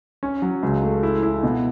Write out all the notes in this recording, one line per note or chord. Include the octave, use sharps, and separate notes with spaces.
C#4
F#3
C#2
A3
E4
E4
B2